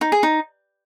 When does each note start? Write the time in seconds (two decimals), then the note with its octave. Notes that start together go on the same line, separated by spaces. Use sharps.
0.01 D#4
0.12 G#4
0.23 D#4